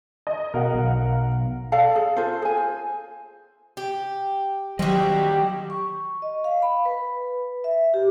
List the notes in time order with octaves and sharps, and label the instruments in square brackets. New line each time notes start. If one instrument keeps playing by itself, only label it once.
[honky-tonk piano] D#5
[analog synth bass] B2 [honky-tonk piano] A#4 F5 F#5
[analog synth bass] B1
[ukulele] A4 D5 F5 A5
G#4
F4 A4 C5
G#4 G#5
C5
[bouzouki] G4
[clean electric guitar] D#3 G3 D#5 [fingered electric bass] F#3 [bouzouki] C4 F#4 [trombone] G4
[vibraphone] C#6
D#5
F5
B5
B4
E5
G4